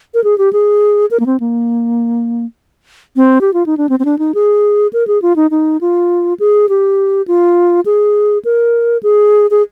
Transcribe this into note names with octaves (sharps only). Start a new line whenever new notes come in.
A#4
G#4
G4
G#4
A#4
A#3
C4
A#3
C4
G4
F4
D#4
D4
C4
C4
D4
D#4
G#4
A#4
G#4
F4
D#4
D#4
F4
G#4
G4
F4
G#4
A#4
G#4
G#4